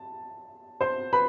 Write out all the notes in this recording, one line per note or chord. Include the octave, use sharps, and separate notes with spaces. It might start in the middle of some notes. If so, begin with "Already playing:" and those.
Already playing: A5
C5 C6
B4 B5